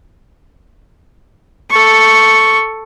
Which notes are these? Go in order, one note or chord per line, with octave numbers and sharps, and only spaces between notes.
A4 C#6